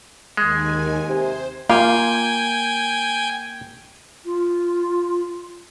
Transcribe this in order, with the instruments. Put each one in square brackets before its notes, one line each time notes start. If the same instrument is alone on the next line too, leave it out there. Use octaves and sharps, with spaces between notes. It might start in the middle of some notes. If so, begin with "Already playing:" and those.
[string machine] D#2 D#3 G#5 [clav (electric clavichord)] G#3
[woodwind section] C3 G#5 [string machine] C5
[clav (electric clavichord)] A#3 [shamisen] F4 [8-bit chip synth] G5 G#5
[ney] F4